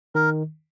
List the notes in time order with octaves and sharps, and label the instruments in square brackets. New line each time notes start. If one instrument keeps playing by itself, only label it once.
[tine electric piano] D#3 [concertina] A#4